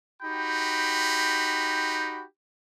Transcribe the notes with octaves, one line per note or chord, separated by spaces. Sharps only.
D#4 F#4 G4 G5 B5